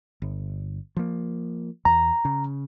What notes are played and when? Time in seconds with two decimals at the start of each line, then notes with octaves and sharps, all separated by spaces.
0.22 G1
0.96 F3 A#3
1.85 E2 A#5
2.25 C#3